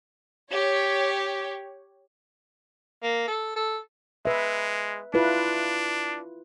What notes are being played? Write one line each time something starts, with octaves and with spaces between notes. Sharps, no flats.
G4 C#5
A#3
A4
A4
G#3 B4 E5
D4 E4 F4 B4